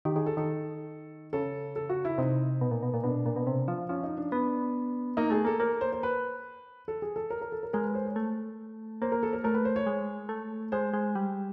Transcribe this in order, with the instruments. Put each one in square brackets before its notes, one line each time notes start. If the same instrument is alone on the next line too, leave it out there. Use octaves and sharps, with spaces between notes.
[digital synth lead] D#3 [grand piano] G4
[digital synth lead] D#3 [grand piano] G#4
[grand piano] A4
[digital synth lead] D#3 [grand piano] A4
[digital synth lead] C#3 [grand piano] A4
[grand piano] A4
F#4
E4
[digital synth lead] C3 [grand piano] D#4
[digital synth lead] B2
A#2
B2
A#2
[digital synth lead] B2 [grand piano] D4
[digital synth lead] A#2
B2
C3
F3
[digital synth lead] F3 [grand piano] C#4
[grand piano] D#4
D4
[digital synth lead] B3 [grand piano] D4
[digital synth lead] A#3 [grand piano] D#4
[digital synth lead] A3 [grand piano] G#4
[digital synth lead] A#3 [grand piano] A4
[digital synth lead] A#3 [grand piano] A#4
[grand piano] C5
C5
B4
A4
G#4
A4
A#4
A#4
A4
A#4
[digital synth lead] G#3 [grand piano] A#4
[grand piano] B4
C5
C#5
[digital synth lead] A3
[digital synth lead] A#3 [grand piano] C5
[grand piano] A#4
A4
A#4
[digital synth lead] A3 [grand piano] A#4
[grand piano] B4
C5
C#5
[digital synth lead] G#3
A3
[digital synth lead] G#3 [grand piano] C5
[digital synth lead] G#3
G3